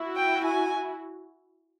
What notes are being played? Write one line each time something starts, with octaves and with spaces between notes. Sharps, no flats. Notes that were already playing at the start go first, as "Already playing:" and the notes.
Already playing: E4 F#4
G5
G#5